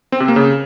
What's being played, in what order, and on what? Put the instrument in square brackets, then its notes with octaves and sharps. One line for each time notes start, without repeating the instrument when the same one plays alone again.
[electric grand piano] C4
C3
A#3
C#3